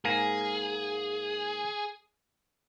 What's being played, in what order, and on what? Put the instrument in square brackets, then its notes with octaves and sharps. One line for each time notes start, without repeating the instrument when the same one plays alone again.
[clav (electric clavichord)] G#2 A#3 G#5 [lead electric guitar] G#4